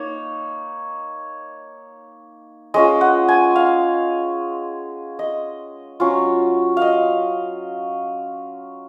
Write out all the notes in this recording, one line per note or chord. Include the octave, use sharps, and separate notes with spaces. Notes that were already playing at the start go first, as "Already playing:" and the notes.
Already playing: A#3 D#4 C#5
G#3 C#4 F4 D#5
F#5
G#5
F5
D#5
F#3 C#4 F4
D#5 F5